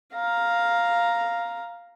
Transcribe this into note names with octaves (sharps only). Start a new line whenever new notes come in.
F5 A#5